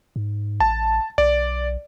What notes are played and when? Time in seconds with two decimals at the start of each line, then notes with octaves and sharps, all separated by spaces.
0.16 G#2
0.60 A1 A5
1.18 B1 D5